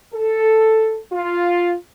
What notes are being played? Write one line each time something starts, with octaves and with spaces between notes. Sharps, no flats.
A4
F4